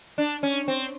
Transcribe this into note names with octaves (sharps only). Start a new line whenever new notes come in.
D4
C#4
C4